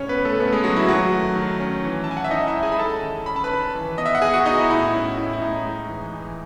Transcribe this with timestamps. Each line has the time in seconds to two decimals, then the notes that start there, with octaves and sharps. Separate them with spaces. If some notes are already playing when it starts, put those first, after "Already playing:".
Already playing: A2 C#3 C#4 C#5
0.08 B3 B4
0.17 C#3
0.25 A3 A4
0.40 C#3 B3 B4
0.52 G#3 G#4
0.64 F#3 C#4 F#4
0.76 E4
0.88 D#3 F#3 F#4
1.12 A3
1.35 D#3
1.60 C#4
1.84 E3
2.04 A5
2.08 E3 G#5
2.17 F#5
2.24 E5
2.31 C#4 D#4 D#5
2.47 E4 E5
2.55 G#3
2.63 G#4 G#5
2.72 B5
2.79 C#4 A4 A5
3.03 D#3
3.26 C#4 B5
3.36 A5
3.44 B4 B5
3.51 D#3
3.75 E3
3.98 B3 D#5
4.06 E5
4.15 F#5
4.22 B3 G#4 G#5
4.34 F#4 F#5
4.46 B3 D#4 D#5
4.59 E4
4.71 A2 E4
4.94 C#4
5.17 A2 E4
5.33 E4
5.42 A2 D#4
5.65 G#3
5.89 E3
6.13 E3